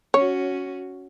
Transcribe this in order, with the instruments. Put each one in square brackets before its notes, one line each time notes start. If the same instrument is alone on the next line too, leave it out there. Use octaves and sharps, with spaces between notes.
[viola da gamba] C#4 F#4 [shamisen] C#5